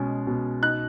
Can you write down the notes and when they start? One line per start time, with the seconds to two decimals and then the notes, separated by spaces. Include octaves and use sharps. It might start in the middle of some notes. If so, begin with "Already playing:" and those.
Already playing: B2 G#3 C#4
0.27 B2
0.62 D#4 F#6